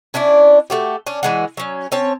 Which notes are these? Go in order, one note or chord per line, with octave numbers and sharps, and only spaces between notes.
C#4 D4 E4 D5
A3 F#4 G4
C#4 D4
E3 G#3 F#4
F#3 C#4
C4 C#4 C#5 A5